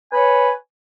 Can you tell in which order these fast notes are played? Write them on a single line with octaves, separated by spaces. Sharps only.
G#5 B4 C#5